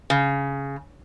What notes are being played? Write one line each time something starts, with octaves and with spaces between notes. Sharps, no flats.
C#3